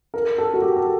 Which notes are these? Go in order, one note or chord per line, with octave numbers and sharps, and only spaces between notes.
A#4
A4
F#4
G4
A4